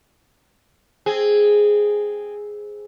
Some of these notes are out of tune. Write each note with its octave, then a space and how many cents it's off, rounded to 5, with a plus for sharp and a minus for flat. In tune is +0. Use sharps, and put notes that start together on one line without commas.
C4 +5 G#4 +0